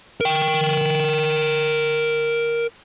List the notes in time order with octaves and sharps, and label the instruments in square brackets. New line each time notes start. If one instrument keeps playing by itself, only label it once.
[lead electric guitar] A#4 G5